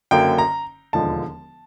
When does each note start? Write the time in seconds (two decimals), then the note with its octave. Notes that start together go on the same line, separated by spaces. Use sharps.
0.11 F#1 F#2 D3 F#3 A#3 G5
0.38 A#5
0.93 E1 D#2 D3 F3 G#3 A5